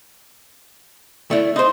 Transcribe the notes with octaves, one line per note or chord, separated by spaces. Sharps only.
A3 E4 D5
D#4 C5 C6